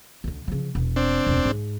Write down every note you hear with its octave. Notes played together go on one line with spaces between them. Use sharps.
D2 D3
C#3 F3
E1
C4 D4
E1 D2
G#2